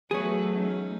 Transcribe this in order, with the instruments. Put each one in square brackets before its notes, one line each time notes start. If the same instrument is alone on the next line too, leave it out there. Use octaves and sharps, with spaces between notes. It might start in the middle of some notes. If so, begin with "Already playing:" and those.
[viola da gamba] E2 F#4 B4 [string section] F#3 A3 [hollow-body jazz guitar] G#4 C#5
[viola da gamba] C#4 D#4